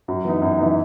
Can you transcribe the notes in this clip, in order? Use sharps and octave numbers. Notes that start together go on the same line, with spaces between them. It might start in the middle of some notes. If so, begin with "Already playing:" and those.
F#2
E3 B3 D#4
F#2
E3 B3 D#4